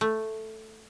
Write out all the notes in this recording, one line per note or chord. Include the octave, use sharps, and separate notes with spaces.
A3